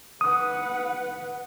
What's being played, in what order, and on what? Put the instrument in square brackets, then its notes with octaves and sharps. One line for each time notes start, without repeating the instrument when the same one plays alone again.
[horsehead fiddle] B4 F#5 [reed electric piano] D#6